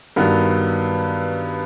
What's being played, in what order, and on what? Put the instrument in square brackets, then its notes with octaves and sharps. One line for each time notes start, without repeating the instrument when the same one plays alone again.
[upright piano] G2 D#3 F#3 B3